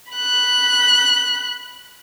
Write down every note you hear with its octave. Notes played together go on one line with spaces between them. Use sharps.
B5 F#6